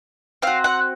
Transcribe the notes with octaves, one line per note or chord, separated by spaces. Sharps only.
C4 F#4 F5
F#5